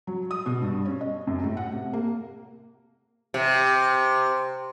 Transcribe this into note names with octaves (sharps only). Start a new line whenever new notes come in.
F#3
D#6
B2
G2
C#4
D#5
F#2
A2
F#5
C3
A#3
C3